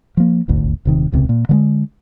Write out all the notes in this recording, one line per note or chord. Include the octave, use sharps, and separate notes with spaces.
F3 A#3
D#1 G#1 D2
D#1 C3 D#3
D#1 C#2 C3
A#2
D3 F#3 G#3